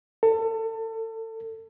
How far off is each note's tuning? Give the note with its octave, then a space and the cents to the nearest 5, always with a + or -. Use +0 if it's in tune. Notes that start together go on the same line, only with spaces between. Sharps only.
A4 +30